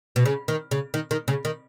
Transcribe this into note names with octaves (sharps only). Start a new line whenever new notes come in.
B2
C#3
D#3
C#3
D#3
D#3
C#3
D#3